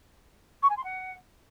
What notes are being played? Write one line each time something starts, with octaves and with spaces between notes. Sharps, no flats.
C#6
G#5
C6
F#5